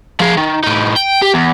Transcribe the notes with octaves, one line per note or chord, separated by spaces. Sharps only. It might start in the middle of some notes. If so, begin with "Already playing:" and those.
F3 G#4
D#3
A2 D#4
G5
G4
E2